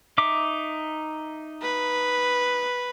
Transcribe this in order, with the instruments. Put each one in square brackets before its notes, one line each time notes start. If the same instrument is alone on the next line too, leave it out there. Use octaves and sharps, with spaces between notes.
[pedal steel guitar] D#4 E5 D6
[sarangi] B4